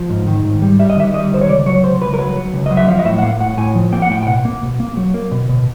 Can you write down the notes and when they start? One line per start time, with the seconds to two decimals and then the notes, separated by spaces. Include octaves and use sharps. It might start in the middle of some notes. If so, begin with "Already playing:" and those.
Already playing: F3
0.10 G#2
0.27 D#3
0.44 G#2
0.62 G3
0.79 G3 E5
0.90 D#5
0.96 D#3 E5
1.14 G3 D#5
1.32 D#3 C5
1.41 C#5
1.49 C#2 D5
1.66 F#3 C#5
1.83 C#2 C5
2.01 C#2 B4
2.14 A#4
2.19 F#3 B4
2.36 F#3
2.53 C#2
2.66 F#3 D#5
2.77 E5
2.88 F3 F5
2.99 D#5
3.05 A2 E5
3.19 F#5
3.22 A#3 F5
3.40 A2 F#5
3.57 A2 G#5
3.75 F3
3.92 A#3 G5
4.02 F#5
4.10 A2 G5
4.23 G5
4.27 B2 F#5
4.45 A#3
4.62 B2
4.80 A#3
4.97 F#3
5.14 A#3
5.31 B2
5.49 B2